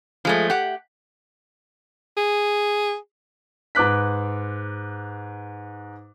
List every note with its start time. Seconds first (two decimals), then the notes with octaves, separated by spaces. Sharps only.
0.25 F3 G#3 A3
0.50 G4 F#5
2.17 G#4
3.75 G#2 B4 D6 F#6 B6